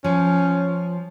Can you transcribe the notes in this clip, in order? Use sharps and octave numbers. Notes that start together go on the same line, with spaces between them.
F3 C#4